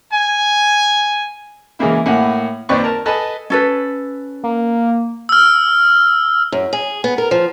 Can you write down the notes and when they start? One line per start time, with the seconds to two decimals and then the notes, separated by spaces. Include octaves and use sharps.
0.13 G#5
1.79 C#3 E3 G#3 A#3 E4
2.06 A2 A#3 E4 F#5 G#5
2.69 D#2 C4 B4 D5 B5 C#6
2.84 A#4 A5
3.05 A4 B4 D#5 G#5 A5 B5
3.50 C#4 A4 B4
4.44 A#3
5.29 E6 F6
6.52 F#2
6.73 G#4
7.04 B3
7.18 A#4
7.31 F3